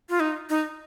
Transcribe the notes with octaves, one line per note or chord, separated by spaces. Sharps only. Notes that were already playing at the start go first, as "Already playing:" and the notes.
F4
D#4
D#4